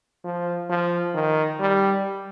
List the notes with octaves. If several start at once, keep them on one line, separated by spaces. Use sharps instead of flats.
F3
F3
D#3
G3